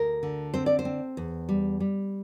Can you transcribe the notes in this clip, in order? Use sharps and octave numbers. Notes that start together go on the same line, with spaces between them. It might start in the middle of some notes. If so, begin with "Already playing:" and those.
Already playing: D2 A#4
D3
C4 C5
D5
C5
C4
E2
G3
G3